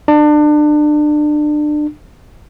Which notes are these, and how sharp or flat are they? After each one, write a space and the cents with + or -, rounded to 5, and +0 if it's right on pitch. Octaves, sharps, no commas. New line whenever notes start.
D4 +30